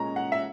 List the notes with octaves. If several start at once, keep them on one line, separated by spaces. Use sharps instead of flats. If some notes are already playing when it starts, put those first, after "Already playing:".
Already playing: A#2 G#3 C#4 A#5
F#5
E5